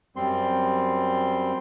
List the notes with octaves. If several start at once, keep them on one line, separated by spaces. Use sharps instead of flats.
F#2 G3 C4 C6